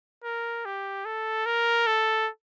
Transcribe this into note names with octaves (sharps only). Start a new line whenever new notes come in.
A#4
G4
A4
A#4
A4